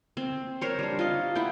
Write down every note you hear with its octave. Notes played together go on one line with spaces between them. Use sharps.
C4
A#4 C5 C#5
G3 D4
F4 D#5
E4 F#5 G5